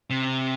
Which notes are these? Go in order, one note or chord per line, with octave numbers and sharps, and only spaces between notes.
C3